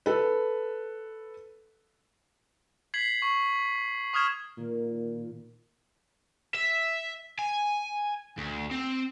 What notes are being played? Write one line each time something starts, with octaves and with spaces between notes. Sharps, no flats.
A4 B4
G#6 B6 C7 F#7
C#6
C#6 D#6 F6 G#6 E7
A#2 D#3 A#3
E5
G#5
D2
C4